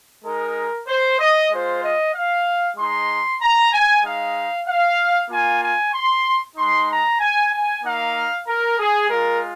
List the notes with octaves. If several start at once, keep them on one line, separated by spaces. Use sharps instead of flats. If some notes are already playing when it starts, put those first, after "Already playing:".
G#3 D#4 A#4
C5
D#5
G#3 F4 C5
D#5
F5
G#3 D#4 C6
A#5
G#5
G#3 D#4 F5
F5
A#3 F4 G#5
G#5
C6
G#3 D#4 C6
A#5
G#5
G#5
A#3 D#4 F5
A#4
G#4
G#3 F4 A#4